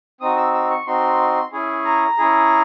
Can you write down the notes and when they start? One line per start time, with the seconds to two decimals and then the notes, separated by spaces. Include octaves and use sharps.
0.21 C4 D#4 F#4 D#6
0.37 E6
0.54 E6
0.70 C#6
0.86 C4 D#4 F#4 C6
1.52 C#4 E4 G#4
1.85 A#5
2.17 C#4 E4 G#4